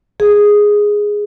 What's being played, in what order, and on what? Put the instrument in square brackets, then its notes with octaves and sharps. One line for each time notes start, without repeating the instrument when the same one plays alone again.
[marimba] G#4